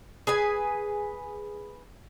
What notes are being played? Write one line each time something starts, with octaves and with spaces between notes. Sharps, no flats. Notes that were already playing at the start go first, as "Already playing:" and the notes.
G#4 B4 G#5